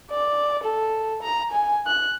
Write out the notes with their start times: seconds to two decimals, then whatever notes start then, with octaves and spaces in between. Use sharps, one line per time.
0.11 D5
0.63 A4
1.23 A#5
1.52 G#5
1.87 F#6